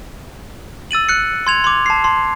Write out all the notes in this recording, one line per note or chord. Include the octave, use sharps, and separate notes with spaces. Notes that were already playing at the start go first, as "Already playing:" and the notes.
E6 A6 D#7 F#7
F#6 C#7
C6 G#6 F7
C6 D6
A5 C7
A5 C6